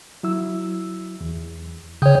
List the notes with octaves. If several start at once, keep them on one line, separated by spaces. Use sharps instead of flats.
F#3 E4 E6
E2
C#3 C#5 G5 D#6 G6